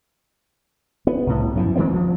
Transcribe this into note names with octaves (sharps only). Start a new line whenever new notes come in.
B3
C2 A2
F#2 E3 F3
D#3 G#3 A#3 C4
D2 F3